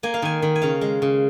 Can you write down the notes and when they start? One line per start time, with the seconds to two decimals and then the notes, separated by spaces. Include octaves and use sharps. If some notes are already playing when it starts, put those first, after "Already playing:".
0.03 A#3 G#5
0.14 F5
0.22 D#3 G#5
0.42 D#3
0.56 G#5
0.62 C#3 F5
0.81 G#3
1.02 C#3